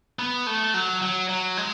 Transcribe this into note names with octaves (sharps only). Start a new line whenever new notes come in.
B3
A3
F#3
F#3
F#3
G#3